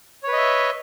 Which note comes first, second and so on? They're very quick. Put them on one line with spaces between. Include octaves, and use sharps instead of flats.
C#5 B4 D#5 E5